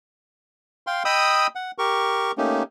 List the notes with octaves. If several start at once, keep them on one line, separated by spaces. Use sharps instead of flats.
F5 G5 C6
D#5 G5 B5 D#6 E6
F#5
G4 A#4 C#6
A3 A#3 C#4 D#4 G4